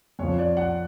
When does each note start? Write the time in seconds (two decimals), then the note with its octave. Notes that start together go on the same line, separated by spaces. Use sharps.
0.19 F2 F3 C#5
0.39 D5
0.57 F#5